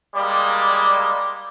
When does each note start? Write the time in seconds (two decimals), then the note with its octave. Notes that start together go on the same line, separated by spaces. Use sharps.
0.15 G3 G#3 A#3 D5